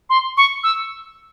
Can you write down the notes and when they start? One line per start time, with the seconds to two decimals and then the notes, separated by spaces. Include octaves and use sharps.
0.10 C6
0.37 C#6
0.64 E6